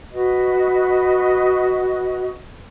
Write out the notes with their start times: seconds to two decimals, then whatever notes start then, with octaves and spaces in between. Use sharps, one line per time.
0.12 F#4 B4 D#5